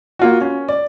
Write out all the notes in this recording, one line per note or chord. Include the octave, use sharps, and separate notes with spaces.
A#3 F4 F#4
C#4
D5